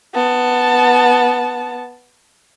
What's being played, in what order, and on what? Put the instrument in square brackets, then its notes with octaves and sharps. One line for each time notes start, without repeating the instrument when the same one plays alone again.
[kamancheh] B3 A5